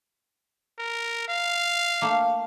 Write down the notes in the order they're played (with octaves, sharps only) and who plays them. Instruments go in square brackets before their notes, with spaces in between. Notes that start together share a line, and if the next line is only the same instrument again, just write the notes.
[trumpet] A#4
F5
[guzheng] A3 A#3